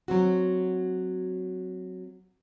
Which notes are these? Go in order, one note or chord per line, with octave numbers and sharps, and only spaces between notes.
F#3 C4 F#4